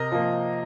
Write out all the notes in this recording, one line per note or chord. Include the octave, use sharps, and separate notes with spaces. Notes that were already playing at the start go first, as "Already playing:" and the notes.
Already playing: C3 A#4 D#5
F3 A#3